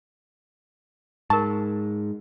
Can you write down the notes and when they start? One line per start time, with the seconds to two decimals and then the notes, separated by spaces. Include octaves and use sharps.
1.30 G#2 A#4 A5 C#6